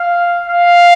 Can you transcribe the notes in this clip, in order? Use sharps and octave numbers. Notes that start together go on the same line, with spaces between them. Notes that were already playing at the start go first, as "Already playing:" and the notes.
Already playing: F5
F5